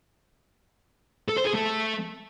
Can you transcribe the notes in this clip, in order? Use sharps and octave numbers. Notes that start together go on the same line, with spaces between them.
A4
C5
G#4
A3